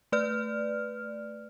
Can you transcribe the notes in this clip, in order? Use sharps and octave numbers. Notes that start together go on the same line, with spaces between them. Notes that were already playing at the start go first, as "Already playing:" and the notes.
A3 B4 D5 F6